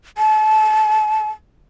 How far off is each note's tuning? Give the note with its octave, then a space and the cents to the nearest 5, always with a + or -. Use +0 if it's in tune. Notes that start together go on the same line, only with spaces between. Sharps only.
A5 -30